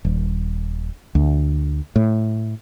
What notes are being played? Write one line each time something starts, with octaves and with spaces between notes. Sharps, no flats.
D#1
D2
A2